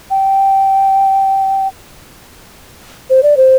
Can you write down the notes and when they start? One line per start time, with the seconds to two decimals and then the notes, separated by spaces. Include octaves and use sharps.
0.10 G5
3.10 C5
3.23 D5
3.37 C5